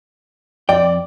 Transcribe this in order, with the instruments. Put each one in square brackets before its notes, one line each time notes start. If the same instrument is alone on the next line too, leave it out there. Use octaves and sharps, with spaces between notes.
[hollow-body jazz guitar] F2 G5 [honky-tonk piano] D5